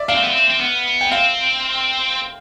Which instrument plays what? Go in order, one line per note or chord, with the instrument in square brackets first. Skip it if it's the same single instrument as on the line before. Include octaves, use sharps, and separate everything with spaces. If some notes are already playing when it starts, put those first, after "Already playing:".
Already playing: [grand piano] D5 E5
[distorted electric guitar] D4 [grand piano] F5
[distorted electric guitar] C4
B3
C4
C4
B3
[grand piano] G5
[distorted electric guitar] C4 [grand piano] F5